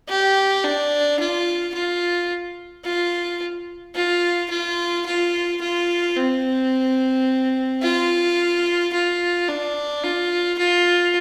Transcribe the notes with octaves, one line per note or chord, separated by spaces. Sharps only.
G4
D4
F4
F4
F4
F4
F4
F4
F4
C4
F4
F4
D4
F4
F4